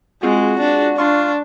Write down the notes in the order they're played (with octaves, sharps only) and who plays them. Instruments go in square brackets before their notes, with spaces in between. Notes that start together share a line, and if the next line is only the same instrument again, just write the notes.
[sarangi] G#3 [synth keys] C4 F4 G#4 [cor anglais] F#4
[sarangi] D4
[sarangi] D4 [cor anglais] F4 [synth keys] C6 C#6